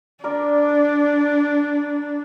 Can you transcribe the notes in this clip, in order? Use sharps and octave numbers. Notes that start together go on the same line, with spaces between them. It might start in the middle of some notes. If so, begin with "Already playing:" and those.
D4 A#4 D5